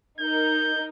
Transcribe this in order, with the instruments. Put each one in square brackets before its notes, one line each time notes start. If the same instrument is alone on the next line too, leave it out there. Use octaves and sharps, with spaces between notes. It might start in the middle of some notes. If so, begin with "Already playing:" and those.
[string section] D#4 A#4 [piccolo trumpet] G6